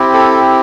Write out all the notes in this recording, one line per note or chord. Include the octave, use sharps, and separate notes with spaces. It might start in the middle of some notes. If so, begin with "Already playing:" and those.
Already playing: C4 E4 G4
A4